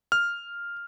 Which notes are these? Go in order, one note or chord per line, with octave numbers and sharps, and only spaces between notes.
F6